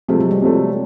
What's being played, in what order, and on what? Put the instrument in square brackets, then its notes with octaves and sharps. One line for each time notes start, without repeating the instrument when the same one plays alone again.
[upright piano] C3 F3 A3 [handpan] G#3
[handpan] F#3
G3
[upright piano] C3 F3 A3